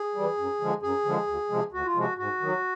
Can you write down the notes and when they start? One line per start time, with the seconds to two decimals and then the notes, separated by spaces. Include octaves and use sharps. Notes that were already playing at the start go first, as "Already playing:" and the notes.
Already playing: G#4
0.15 E3 G3
0.38 F#2
0.61 D3 F3 G#3
0.82 F#2 G#4
1.05 D3 F3 G#3
1.27 D2
1.50 C3 F3 G#3
1.72 D2 F#4
1.85 F4
1.95 C3 F3 G#3 F#4
2.18 G#2 F#4
2.41 D#3 F#3